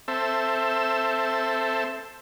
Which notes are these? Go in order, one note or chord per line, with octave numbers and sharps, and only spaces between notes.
C4 A4 E5